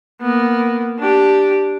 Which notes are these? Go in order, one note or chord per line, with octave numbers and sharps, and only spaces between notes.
A#3 B3
D4 G4